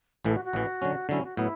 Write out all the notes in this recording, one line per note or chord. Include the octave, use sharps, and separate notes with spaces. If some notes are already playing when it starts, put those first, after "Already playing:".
A1 A2 E3 A4
F#4
F#4
A1 A2 E3
D3 F#3 C#4
D3 F#3 C#4 E4
F#4
A2 F#3 B3 E4